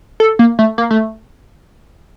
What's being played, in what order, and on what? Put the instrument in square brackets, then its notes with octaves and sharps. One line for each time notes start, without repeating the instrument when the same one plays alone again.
[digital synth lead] A4
A#3
A3
A#3
A3